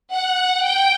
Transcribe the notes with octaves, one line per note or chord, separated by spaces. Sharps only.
F#5
G5